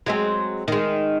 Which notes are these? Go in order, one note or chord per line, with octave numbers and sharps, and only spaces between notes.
F#3 G#3 C4
D#3 G#3